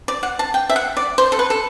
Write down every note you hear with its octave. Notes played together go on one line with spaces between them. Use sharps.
D5
F#5
A5
G5
E5
F#5
D5
C5
A4
B4
A4